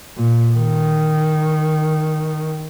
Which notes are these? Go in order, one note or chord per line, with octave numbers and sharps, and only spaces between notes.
A#2
D#3